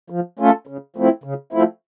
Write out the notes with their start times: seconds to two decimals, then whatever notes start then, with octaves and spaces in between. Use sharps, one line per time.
0.10 F3
0.39 A3 C#4 F4 A4
0.67 C#3
0.96 F3 A3 C4 E4
1.24 C#3
1.53 F3 A3 C4 E4